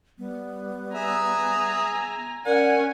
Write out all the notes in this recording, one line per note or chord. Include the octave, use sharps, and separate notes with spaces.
G3 B3
G#4 E5 G#5 A#5
C#4 A#4 D5 F#5 G#5